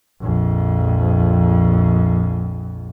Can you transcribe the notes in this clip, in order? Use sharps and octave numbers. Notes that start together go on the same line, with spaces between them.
A#1 F2